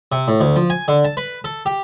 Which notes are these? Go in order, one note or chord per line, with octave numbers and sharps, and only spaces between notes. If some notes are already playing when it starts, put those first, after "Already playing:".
C3
A2
D2
F3
G#5
D3
A5
B4
A4
G4